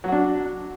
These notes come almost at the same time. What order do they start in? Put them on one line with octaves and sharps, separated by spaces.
F#3 F#4 D4